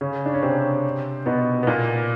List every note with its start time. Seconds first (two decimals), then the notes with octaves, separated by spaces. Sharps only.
0.01 C#3 C#4
0.25 D4
0.34 C#4
0.42 C3 C4
1.26 B2 B3
1.63 B3
1.67 A#2 A#3